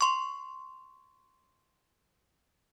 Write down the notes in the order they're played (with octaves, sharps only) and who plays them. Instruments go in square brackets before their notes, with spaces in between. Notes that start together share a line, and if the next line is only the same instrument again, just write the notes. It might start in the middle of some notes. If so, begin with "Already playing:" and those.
[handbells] C6 C#6